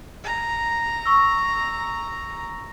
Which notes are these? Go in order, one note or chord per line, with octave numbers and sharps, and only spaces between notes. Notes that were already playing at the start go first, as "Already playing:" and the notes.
A#5
C#6 E6